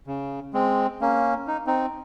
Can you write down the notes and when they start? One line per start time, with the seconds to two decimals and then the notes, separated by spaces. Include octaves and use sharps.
0.07 C#3
0.53 G#3 C4
1.01 A#3 C#4
1.48 D#4
1.67 C4 D#4